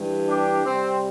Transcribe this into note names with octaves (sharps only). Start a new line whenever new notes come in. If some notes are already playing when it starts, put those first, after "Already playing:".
Already playing: G2 E3 G3
D4 G4
C3 G3 C4